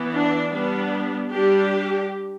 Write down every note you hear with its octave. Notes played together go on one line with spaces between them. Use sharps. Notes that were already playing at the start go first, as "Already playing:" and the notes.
Already playing: E3 B3
D4
G3 B3 D4
G3 D4 G4